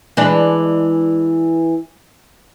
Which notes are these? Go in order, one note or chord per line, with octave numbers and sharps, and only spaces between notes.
E3 G#3 D4